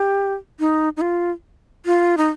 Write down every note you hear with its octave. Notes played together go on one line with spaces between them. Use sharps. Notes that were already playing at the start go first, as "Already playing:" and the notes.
Already playing: G4
D#4
D#4
F4
F4
D#4